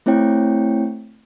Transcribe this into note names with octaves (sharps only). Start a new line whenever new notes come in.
A3 C4 E4 C#5 G5